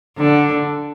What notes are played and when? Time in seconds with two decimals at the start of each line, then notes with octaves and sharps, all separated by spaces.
0.18 D3